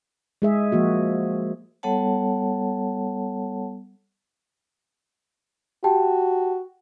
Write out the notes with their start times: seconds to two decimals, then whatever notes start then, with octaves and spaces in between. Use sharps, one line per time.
0.42 G#3 G#4 E5
0.72 F3 A#3 F#4
1.83 G3 B3 A4 C#5 F#5 A5
5.84 F#4 G4 G5 A5